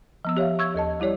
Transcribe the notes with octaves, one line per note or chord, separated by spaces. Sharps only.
F3 B3 E6
G4 C#5 E5 F5
C#6 E6 G#6
D#2 A4 D#5 A5
G3 E4 G4 C#5 D5